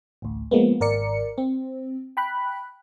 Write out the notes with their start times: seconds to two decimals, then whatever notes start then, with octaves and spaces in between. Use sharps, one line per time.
0.22 A1 D2
0.51 F3 G#3 A#3 B3
0.80 G#1 A#4 D5 C#7
1.38 C4
2.17 G5 B5 F#6